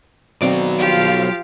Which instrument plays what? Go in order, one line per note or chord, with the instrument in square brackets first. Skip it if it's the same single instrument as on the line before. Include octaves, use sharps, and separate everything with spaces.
[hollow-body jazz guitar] D#2 C4 D5 [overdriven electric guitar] B2 F#3
[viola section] F3 F4 F5 [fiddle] G4